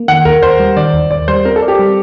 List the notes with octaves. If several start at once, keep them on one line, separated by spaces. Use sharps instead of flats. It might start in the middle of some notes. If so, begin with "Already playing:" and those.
Already playing: A#3
D#3 F#5
D#2 A#4
D#2 C5
G3
D#3 D5
D#2
D#2 D5
G3 C5
C4 A#4
A4
D5
G4
G3